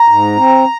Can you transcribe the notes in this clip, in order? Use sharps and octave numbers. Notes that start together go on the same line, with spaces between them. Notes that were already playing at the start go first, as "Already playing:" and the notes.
Already playing: A#5
G#2
C4